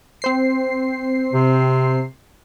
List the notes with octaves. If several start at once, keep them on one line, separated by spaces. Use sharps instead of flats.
C4 C5 C7
C3